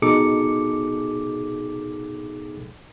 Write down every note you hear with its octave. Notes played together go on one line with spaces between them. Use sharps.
B2 D#4 G#4 A4 D6 C#7